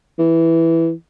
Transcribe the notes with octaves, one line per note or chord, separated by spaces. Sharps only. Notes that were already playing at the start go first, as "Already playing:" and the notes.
E3